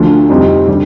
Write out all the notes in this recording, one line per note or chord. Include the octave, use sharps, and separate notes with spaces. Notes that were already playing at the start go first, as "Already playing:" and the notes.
Already playing: D2 D3 F3
F2 C3 G3 C4 D#4
D3 G3